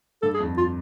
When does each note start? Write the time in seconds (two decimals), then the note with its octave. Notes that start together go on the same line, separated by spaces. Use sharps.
0.22 G2 A4
0.34 G#4
0.40 F2
0.57 F4